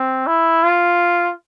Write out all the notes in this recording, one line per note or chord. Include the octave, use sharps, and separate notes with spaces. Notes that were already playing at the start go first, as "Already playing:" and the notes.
Already playing: C4
E4
F4